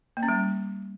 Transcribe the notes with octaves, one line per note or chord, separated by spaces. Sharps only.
A#3
C#4
G3